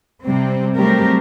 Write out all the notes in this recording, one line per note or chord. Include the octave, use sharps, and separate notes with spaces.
C3 G3 C4
F#3 G3 A3 C4 G4 A#4